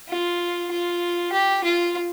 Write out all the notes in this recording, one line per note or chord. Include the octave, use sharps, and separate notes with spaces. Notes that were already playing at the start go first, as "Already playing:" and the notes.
F4
F4
G4
F4